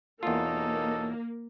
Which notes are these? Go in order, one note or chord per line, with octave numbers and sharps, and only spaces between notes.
E2 B2 A#3 D#4 F4 A4 C#5